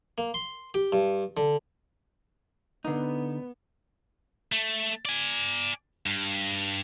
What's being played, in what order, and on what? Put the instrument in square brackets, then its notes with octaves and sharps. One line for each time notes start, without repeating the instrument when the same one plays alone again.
[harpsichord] A#3
C6
G4
G2
D3
[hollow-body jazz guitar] D3 D#4 [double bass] B3
[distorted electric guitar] A3
D5 G#5
G2